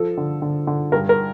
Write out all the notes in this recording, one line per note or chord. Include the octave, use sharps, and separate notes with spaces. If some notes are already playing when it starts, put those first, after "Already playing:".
Already playing: F3 A4
D3
D3
D3
G2 A#4
A#4